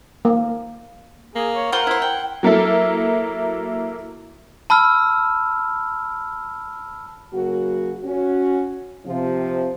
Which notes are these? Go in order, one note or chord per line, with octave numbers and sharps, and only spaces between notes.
A#3
A#3 G#4
C#5
F4 A#4 C5 F#5 C6
E4 C5
G5
F#3 A#3 E4 A4
A5 B5 E6 F6
C#3 F#3 A#3 F#4
C#4 F#4
C3 F3